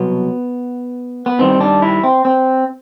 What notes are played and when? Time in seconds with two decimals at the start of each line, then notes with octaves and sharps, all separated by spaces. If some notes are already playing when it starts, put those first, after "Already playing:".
Already playing: C2 B2 F#3 B3
1.26 B3
1.39 G2 D#3 G3 C4
1.61 D4
1.82 E4
2.04 C4
2.25 C4